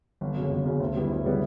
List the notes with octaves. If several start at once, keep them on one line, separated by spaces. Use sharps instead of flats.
G1
F#2 C#3
G1
F#2 C#3
D2
C#3 G3 B3 E4
D2
C#3 G3 B3 E4